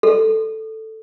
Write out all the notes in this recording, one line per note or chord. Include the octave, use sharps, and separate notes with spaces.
A4